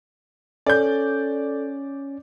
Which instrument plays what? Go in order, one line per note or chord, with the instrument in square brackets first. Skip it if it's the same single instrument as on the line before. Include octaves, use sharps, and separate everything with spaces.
[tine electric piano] C#4 [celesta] A4 [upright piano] D5 G6